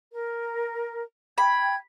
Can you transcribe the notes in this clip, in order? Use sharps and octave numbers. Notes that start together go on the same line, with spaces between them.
A#4
G5 B5 G#6